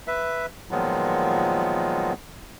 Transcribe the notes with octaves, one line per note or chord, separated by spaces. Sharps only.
B4 E5
A#2 D#3 F3 F#3 G#3 B3